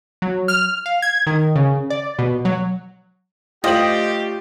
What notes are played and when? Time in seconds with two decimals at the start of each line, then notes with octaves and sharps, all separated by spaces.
0.22 F#3
0.48 F6
0.86 F5
1.02 G#6
1.27 D#3
1.56 C#3
1.90 D5
2.19 B2
2.45 F#3
3.64 A3 F4 G4 C5 D5 D#5 G5 F#7